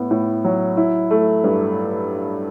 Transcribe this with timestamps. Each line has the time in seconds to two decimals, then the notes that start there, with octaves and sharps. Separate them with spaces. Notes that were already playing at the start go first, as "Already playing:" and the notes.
Already playing: A2 B3
0.11 A2
0.44 F#3
0.77 E4
1.11 A3
1.44 G2